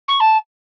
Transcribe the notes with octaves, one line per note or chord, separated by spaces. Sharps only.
C#6
A5